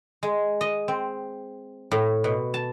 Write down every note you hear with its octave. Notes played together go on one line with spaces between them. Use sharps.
G#3
D#5
C4
A2
B2
A5